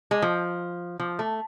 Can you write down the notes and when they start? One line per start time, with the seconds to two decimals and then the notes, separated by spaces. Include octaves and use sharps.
0.11 G#3
0.22 F3
1.00 F3
1.19 A3